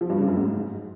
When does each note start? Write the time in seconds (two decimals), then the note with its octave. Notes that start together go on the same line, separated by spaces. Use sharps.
0.01 F3
0.10 G2
0.19 C#3
0.28 F#2
0.37 G#2